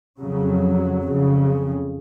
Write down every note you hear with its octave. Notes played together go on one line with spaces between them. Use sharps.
F2 C#3 F#3
F2 C#3